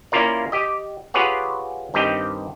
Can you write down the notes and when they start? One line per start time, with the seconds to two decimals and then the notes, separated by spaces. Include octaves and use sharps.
0.12 A#3 C#4 E4 F4 A#4 D5
0.52 G4 D#5
1.14 F4 G4 G#4 B4 C#5 F#5
1.94 G2 D#3 C4 G4 D#5 G5